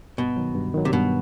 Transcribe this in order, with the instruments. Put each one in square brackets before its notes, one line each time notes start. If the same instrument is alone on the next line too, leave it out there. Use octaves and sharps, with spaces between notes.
[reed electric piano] G2 [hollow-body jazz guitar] B2
[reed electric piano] D#3 F#3
G2
D#3 F#3
[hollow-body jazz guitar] C3
[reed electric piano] G2 [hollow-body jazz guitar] B2